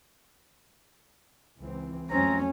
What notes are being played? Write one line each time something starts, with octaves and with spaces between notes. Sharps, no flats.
C#2 E3 C4
F2 F#3 A3 C4 C#4 A#5